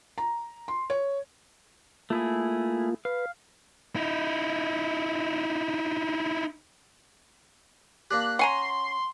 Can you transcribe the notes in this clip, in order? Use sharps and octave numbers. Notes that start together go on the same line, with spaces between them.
A#5
C6
C#5
A3 A#3 E4 F4 G#4
B4 F5
D#4 E4
A#3 D4 G4 F#6
C#4 F#5 G#5 A#5 C6